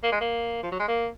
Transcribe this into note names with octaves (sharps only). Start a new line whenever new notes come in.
A#3
G#3
A#3
F3
F#3
G#3
A#3